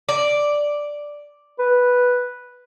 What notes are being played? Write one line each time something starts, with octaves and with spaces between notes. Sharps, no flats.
D5
B4